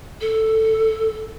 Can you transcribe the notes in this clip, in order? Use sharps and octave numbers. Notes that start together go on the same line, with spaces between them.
A4